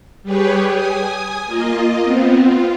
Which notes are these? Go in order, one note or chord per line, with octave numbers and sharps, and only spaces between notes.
G3 G4 G#4 B4 C#5 G5
G#5 D#6
A#3 F4 D#5
B3 C4
F4